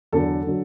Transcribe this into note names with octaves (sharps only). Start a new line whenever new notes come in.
E2 D3 F#3 A4
D3 F#3